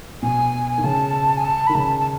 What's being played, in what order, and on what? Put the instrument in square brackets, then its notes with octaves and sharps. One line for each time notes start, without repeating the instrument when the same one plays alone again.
[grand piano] B2 [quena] G#5
[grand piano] D#3
[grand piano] C#3 [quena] A5
[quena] G#5
A5
[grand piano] D#3 [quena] B5
[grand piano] C#3 [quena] A5
[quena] A5